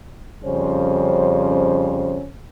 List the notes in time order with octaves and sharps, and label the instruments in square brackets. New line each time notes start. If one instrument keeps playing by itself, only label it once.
[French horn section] F2 C#3 G3 C#4 C5